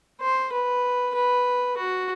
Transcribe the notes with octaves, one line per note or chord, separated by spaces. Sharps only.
C5
B4
B4
F#4